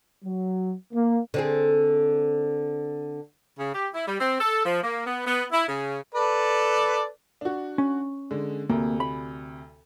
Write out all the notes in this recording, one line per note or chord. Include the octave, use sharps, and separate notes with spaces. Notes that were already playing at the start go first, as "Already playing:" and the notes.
F#3
A#3
D3 C4 G#4
C#3
G4
E4
G3
C4
A4
F3
A#3
B3
B3
E4
C#3
A4 B4 D5
D4 F#4
C#4
D3 G#3
D2 C3 A#3
B5